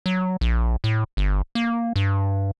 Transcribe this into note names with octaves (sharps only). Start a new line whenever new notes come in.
F#3
A#1
A2
G1
A#3
G2